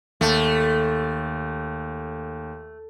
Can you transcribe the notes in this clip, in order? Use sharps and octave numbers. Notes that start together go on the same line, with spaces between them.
D#2 A3